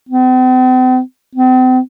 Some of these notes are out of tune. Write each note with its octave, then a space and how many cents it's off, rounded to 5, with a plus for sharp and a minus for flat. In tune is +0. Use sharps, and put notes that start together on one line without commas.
C4 -45
C4 -40